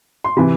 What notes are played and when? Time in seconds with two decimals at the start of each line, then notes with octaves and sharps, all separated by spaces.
0.24 C6
0.37 C3 E3 B5